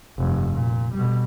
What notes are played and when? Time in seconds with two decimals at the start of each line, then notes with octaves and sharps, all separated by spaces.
0.18 F1 G2
0.54 A#2
0.94 B2 G3